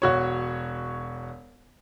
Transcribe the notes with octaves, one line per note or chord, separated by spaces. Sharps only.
E1 F#4 C#5